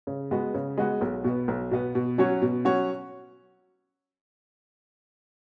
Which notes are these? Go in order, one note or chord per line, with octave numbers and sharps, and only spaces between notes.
C#3
G#3 B3 F#4 B4
C#3
G#3 B3 F#4 B4
B1
B2 B3
B1
B2 B3
B2
F#3 C#4 F#4 C#5
B2
F#3 C#4 F#4 C#5